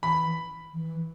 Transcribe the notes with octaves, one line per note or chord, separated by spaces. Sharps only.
E3 B5
E3